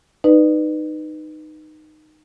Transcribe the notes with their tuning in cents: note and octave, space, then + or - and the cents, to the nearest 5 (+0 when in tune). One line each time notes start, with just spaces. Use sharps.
D#4 -15 B4 +0 D5 +35